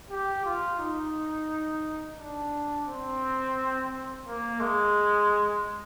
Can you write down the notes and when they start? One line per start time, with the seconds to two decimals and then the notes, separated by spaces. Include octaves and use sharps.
0.11 G4
0.45 F4
0.79 D#4
2.18 D4
2.88 C4
4.26 A#3
4.61 G#3